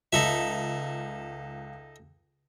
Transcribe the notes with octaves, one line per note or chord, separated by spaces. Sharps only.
C#2 D#4 A4 E5